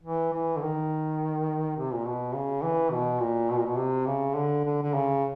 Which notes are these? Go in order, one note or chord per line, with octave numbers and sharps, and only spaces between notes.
E3
E3
D3
D#3
C3
A#2
B2
C#3
E3
B2
A#2
B2
A#2
B2
C3
C#3
D3
D3
D3
C#3